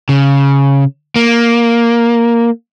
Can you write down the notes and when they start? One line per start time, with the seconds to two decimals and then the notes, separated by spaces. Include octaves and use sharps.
0.09 C#3
1.16 A#3